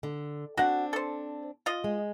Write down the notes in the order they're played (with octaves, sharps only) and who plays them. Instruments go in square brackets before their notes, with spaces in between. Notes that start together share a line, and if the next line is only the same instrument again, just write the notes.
[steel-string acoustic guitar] D3
[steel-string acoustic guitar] C4 D4 [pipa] F#4 F#5
[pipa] A4 C5
F4 D#5
[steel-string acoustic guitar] G#3